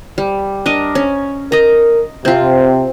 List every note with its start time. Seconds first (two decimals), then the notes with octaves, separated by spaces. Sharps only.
0.18 G3
0.66 D4 A#4 D#5
0.95 C#4
1.52 A#4 D#5 A#5
2.25 C3 C4 F4